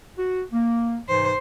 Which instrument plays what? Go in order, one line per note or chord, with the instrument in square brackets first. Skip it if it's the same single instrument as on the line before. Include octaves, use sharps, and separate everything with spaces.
[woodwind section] F#4
A#3
[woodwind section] G#2 C3 E3 [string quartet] C5